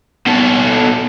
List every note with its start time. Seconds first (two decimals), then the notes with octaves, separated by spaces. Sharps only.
0.27 B2 A4